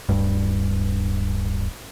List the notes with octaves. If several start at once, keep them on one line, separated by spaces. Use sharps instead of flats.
D1 G2